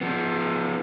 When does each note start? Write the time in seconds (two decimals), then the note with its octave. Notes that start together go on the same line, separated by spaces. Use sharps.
0.01 F3 B3